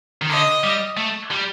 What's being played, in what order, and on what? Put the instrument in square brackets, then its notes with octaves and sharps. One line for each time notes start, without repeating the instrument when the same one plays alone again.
[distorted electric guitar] D#3
[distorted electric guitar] D3 [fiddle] D#5
[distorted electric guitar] G3
A3
G3